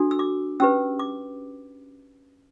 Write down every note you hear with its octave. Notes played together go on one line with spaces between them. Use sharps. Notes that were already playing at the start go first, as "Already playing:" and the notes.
Already playing: D4 F#4 A4
E6
D6
C#4 G4 B4 E6
D6